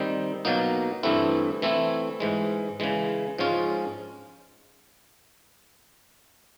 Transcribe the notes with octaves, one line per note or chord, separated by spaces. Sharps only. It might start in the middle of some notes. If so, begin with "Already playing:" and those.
Already playing: D#3 G3 C4 D#4
B2 F#3 A#3 D#4
G2 E3 A3 C4 E4
E3 A3 C4 E4
G#2 E3 G#3
C#3 E3 G#3
G#2 F3 G#3 C#4 F4